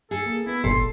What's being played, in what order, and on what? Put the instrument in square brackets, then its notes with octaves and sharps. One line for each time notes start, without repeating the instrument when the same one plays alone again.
[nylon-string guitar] G#4 [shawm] A4
[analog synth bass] A#3
[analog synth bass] B3 [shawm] E4
[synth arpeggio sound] G1 A#2 [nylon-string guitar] A4 [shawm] C6
[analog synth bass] G#1